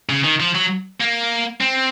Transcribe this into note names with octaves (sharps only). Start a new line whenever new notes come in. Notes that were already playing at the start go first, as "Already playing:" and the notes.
C#3
D#3
F3
F#3
A#3
C4